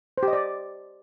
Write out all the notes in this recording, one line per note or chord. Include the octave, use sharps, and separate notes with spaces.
C5
G4
D#5
D5